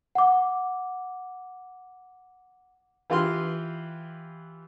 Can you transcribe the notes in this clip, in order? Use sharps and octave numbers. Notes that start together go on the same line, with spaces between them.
F#5 D6
E3 F4 G4 B4 C6 F6